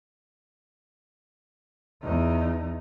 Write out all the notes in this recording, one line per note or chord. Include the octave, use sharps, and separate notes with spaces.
E2 D#4